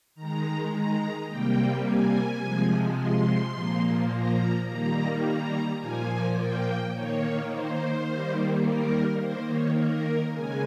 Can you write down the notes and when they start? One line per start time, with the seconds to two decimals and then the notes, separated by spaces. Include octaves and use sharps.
0.15 D#3 G#3 A#5
0.72 A#5
1.28 C3 G3 A#3 G5
1.84 G#5
2.41 C3 F3 G#3
2.98 C6
3.54 A#2 F3 A#3
4.11 A#5
4.67 D#3 G3 A#3 A#5
5.24 A#5
5.80 A#2 F3 A#3 G#5
6.37 G5
6.93 D#3 A#3 C#5
7.50 C5
8.06 D#3 G3 A#3
8.62 A#4
9.19 D#3 A#3 C5
9.48 C#5
9.76 A#4
10.32 C#3 G#3 G#5